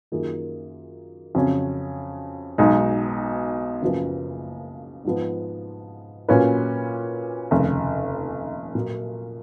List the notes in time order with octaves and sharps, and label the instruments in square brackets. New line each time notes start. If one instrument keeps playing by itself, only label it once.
[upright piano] F#2 D#3 A#3 F4 G#4
F2 C#3 F#3 C#4
B1 B2 G#3 D#4
F#1 F#2 C#3 F3 B3
G#2 F3 B3
A#2 F#3 C#4 F4 B4
F1 D#2 C#3
A#2 F#3 A#3